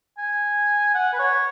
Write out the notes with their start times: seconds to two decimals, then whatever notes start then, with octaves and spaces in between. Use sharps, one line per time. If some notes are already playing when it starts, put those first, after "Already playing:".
0.18 G#5
0.94 F#5
1.13 B4
1.19 C#5